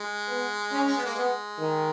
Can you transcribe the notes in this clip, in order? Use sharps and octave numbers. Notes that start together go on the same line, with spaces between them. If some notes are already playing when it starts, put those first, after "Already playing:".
Already playing: G#3
B3
C#4
C#4
B3
A#3
G#3 B3
D#3